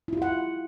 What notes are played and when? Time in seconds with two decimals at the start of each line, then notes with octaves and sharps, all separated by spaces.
0.08 E4
0.13 F4
0.17 G4
0.22 F#5